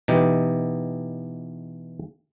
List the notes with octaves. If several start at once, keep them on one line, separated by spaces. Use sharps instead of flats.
B2 E3 D#4 G4